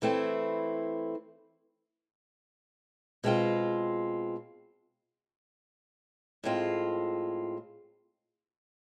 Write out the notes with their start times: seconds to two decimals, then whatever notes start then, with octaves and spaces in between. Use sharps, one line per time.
0.02 E3 A3 C4 E4
3.24 B2 G#3 C4 F4
6.44 A2 G#3 C4 F4